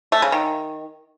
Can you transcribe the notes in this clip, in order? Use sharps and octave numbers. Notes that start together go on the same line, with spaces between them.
A3
C#3
D#3